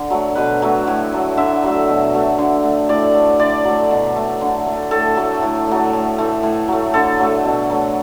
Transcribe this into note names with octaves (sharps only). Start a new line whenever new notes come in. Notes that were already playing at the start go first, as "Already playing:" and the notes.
Already playing: D3
F#3 A3
B2 B4
F#3 A3
A2
F#3 A3
D3 E5
F#3 A3
B2
F#3 A3
D3
A3
A2 D5
A3
D3 D5
F#3 A3
B2
A3
D3
A3
A2 A4
F#3 A3
A2
F#3 A3
A2
E3 A3
A2
F#3 A3
D3 A4
F#3 A3
B2
F#3 A3